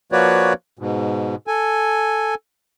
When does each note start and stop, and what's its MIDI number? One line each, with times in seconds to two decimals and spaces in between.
0.12 0.53 53
0.12 0.53 58
0.12 0.53 66
0.12 0.53 71
0.12 0.53 73
0.12 0.53 74
0.79 1.35 44
0.79 1.35 47
1.47 2.35 69
1.47 2.35 80